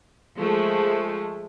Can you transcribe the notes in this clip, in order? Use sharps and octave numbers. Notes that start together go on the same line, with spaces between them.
F3 G#3 A3